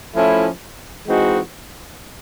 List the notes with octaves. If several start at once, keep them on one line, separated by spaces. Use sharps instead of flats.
F3 A3 C#4 E4
E3 G#3 C4 D#4 F#4